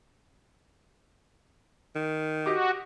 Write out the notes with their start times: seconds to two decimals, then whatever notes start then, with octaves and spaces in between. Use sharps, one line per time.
1.96 D#3
2.46 F#4 G4 D#5 D6